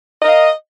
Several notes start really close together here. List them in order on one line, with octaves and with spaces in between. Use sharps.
D#5 A#4 F5